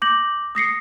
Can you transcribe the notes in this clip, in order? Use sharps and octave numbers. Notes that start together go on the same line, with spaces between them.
D6 G6 A#6 F#7
D#6 A#6 C7 C#7